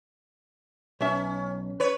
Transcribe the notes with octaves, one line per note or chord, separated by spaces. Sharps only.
B1 C#4 E5
B4 C#5